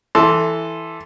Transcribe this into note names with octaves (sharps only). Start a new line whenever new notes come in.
E3 A4 C6